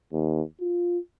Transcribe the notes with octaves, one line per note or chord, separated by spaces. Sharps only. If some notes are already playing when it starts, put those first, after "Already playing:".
D#2
F4